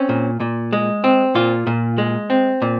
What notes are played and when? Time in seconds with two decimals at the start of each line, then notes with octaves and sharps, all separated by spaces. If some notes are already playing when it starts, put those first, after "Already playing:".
Already playing: C4 C#4
0.09 A#2
0.40 A#2
0.73 G#3
1.04 C4
1.35 A#2 F4
1.67 A#2
1.98 G#3
2.30 C4
2.62 A#2